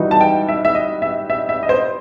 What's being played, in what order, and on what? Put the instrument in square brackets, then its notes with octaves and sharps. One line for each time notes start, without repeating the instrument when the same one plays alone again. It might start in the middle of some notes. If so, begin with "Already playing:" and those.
Already playing: [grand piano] E3 G3 D#4 F#4
[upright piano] A5
G5
E5
E5
D#5
E5
E5
E5
D#5
C5